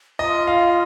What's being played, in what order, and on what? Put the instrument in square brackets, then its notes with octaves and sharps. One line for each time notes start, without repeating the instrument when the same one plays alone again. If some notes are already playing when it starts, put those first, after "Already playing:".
[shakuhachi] F4 [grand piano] D#5
[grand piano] F5